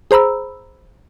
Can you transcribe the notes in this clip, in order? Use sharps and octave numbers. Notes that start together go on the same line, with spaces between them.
G#4 C5 A#5 B5 E6